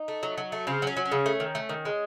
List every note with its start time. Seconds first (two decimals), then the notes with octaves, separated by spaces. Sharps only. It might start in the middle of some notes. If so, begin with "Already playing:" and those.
Already playing: D#4
0.08 A3
0.23 F#3
0.38 F#3
0.52 A3
0.67 C#3 C4
0.82 F#3 C#4
0.97 F#3
1.06 C#4
1.12 C#3
1.26 A3
1.40 D#3
1.55 A3
1.69 D#3
1.85 G#3